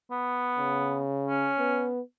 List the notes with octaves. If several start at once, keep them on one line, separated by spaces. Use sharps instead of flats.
B3
C#3
C#4
B3